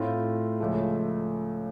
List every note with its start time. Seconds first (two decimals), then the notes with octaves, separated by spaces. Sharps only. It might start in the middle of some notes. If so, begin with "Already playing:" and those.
Already playing: A2 A3 C4 F4
0.60 C#2 C#3 F3 A3